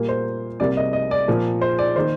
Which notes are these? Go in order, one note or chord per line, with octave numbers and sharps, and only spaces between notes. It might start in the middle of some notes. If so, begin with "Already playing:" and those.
Already playing: A#2 G3 A#3
C5
C2 C3 G3 A#3 D5
D#5
D#5
D5
A#2 F3 A#3
C5
D5
D#3 A#3 C5